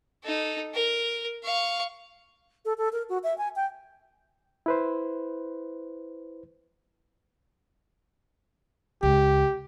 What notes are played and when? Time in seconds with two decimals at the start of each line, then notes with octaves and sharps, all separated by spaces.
0.24 D#4 A4
0.74 A#4
1.43 F5 C#6
2.65 A4
2.78 A4
2.93 A#4
3.09 F#4
3.24 E5
3.38 G#5
3.56 G5
4.66 E4 B4 C5
9.03 C#2 G4